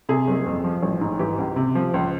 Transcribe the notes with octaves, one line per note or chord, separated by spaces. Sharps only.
C3 G#4
F#1
F2
F3
A1
G#2
E3 G4
C#2
C3
F3
C#2